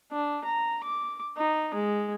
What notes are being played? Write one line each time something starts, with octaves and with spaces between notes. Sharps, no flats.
D4
A#5
D6
D#4
G#3